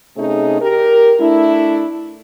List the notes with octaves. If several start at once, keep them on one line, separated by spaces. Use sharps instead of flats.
C3 A3 C#4 D#4 G#4
G4 A#4
A3 D4 E4